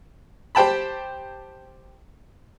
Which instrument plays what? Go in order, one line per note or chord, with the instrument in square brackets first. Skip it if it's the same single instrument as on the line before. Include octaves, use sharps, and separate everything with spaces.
[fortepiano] G4 C5 G5 A5 B5